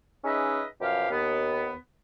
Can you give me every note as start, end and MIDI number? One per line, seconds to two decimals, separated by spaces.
0.25 0.63 61
0.25 0.63 63
0.25 0.63 68
0.25 0.63 71
0.25 0.63 75
0.25 0.63 76
0.81 1.07 42
0.81 1.07 47
0.81 1.07 53
0.81 1.07 67
0.81 1.07 77
1.10 1.75 39
1.10 1.75 59